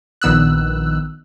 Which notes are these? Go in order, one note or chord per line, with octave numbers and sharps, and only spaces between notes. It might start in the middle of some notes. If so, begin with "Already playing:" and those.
A#1 D#3 B3 E6 F#6